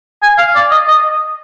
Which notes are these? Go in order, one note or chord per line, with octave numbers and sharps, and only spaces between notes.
G#5
F5
D5
D#5
D#5